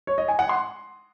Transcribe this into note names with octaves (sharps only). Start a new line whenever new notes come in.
C#5
D#5
G#5
F#5
C6